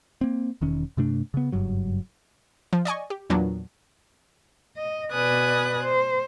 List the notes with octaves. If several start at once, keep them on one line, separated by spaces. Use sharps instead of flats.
A#3 C4
E1 D#3 C#4
G2 C3 A3 D4
C#3 B3
F#1 G2 F#3
F3
D5 D#5 G#5 C#6
G4
E2 A#2 F#3 B3 D4
D#5
B2 B4 D5 G#5 D#6 F#6
C5